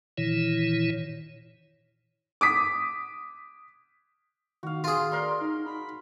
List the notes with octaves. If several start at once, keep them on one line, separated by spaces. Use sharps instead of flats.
A#2 D#3 E3 E4 C#5
D6 D#6 B6
D#3 F#4 F5
F4 G#4
A#4 D5 C6
D#4
B5